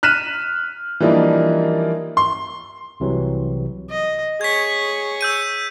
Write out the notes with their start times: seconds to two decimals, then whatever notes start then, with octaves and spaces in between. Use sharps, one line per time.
0.03 F6 F#6 B6 D#7 E7
1.00 E3 F3 G3 A#3 D4 D#4
2.17 C6
3.00 C2 C3 E3 F#3
3.90 D#5
4.41 G#4 C#5 G#6 B6
5.21 E6 G6 D#7